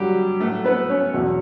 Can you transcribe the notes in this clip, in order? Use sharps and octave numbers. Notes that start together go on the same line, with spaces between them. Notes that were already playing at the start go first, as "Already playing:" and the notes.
Already playing: G2 D3 F#3 G3 G4
A2 F#3 A3 A4
B3 B4
C#4 C#5
E2 B2 F#3